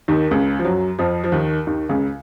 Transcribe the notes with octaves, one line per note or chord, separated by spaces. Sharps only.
D#2 D#3
C#2 C#3
F3
F#2 F#3
F2 F3
F3
D#2 D#3
D#2 D#3
C#2 C#3